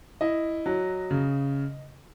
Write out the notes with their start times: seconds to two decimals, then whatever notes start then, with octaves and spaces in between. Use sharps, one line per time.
0.21 E4 D#5
0.66 F#3
1.11 C#3